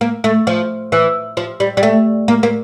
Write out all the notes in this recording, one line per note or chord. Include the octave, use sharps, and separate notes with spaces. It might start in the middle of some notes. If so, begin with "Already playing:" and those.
A#3
A3
F3
E3
F3
G3
G3
A3
A#3
A#3